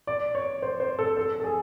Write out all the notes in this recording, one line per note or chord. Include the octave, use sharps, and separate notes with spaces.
D5
C#5
C5
C5
A4
A4
A4
G#4